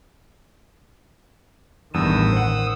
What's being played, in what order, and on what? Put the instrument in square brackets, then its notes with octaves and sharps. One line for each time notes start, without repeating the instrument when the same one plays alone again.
[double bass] A1 D#3 [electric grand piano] E2 G2 [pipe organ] D#6 E6
[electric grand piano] C5 F#5